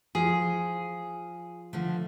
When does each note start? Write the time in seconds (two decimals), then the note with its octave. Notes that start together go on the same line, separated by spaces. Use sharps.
0.15 F3 G#4
1.73 D3 F3 A3